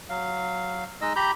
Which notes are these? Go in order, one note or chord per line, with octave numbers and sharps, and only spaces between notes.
F#3 F5
G#3 D#4 D#5 E6
G4 A#5 B5 G6